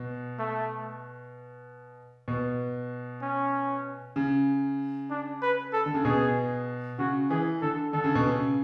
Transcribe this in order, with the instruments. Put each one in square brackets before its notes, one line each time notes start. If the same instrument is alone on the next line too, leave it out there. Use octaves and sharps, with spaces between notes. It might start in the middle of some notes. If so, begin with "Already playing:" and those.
Already playing: [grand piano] B2
[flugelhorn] A3
[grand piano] B2
[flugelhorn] C#4
[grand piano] C#3
[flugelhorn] D4
B4
A4
[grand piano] D3
C#3
[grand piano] B2 [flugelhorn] G#4
[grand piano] C#3 [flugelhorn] F#4
[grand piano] E3 [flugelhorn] G#4
[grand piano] D3 [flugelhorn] A4
[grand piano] D3 [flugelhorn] A4
[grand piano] C#3
B2
C#3